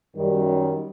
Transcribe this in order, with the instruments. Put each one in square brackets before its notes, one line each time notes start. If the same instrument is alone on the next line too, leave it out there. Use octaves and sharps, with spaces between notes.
[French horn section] F#2 D#3 G3